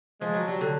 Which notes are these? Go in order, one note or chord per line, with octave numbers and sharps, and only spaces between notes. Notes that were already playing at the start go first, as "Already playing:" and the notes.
F3 G#3
F#3
F#3 G3
D3